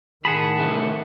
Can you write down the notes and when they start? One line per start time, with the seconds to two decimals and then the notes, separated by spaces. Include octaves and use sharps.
0.25 A2 D#3 G#4 F#5 A5 B5
0.59 C2 A3